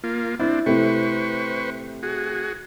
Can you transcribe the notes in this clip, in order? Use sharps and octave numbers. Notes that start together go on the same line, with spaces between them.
A#3 F4
C4 D4 E4
C3 A3 E4 B4 C5 C#6
F#4 G#4